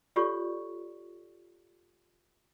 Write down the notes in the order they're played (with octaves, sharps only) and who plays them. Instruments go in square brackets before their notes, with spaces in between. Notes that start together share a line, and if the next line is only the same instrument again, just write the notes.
[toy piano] F4 G4 A4 C#5 D5 C#6